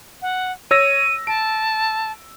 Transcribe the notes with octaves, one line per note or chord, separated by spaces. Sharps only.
F#5
C#5 E6 A#6 D#7
A5 D7